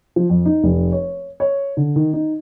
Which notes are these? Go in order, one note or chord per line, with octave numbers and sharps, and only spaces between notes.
F3
F2
D#4
F1
C#5
C#5
D3
D#3
D#4